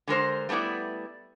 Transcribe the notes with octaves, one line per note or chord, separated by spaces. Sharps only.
D3 G#3 A#4 C5
G3 A3 B3 E4 D5